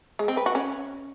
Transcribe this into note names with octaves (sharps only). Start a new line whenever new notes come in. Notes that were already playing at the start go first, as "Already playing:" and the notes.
G#3
C4
B4
F#4
C#4